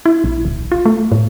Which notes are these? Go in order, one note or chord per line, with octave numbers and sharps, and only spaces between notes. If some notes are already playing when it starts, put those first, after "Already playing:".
E4
A#1
D1
F4
A3
A2